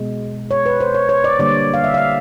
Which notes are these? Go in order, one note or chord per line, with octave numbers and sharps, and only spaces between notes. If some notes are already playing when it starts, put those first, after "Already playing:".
Already playing: B2 G#3
C#5
B4
C5
C#5
C#5
D5
D3 G3 A#3 D5
F5
E5
F5
E5